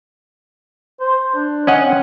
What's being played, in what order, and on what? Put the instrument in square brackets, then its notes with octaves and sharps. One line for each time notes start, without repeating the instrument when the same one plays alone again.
[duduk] C5
D4
[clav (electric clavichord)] C#4 D#5 F#5
[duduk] C4